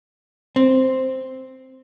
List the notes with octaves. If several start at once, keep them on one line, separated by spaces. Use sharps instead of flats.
C4